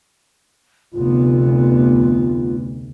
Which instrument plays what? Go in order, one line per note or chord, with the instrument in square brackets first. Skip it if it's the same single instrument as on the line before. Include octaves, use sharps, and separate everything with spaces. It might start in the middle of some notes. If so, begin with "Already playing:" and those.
[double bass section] F1 D2 B3 [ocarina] F4